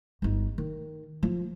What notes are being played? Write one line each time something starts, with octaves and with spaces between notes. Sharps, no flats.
G1 D#4
D#3
F3 F4